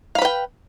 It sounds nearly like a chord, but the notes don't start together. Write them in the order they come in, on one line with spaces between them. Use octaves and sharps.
F5 B5 B4 G5